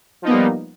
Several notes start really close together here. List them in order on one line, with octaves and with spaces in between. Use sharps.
F3 D#4 B3 A#3 G3